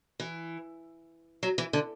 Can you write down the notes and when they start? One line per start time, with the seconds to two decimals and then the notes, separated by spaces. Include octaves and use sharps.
0.20 E3
1.43 F#3
1.58 E3
1.73 D3